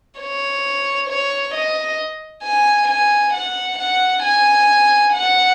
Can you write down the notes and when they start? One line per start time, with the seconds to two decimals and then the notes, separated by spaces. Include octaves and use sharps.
0.20 C#5
1.09 C#5
1.54 D#5
2.43 G#5
2.88 G#5
3.33 F#5
3.79 F#5
4.23 G#5
5.13 F#5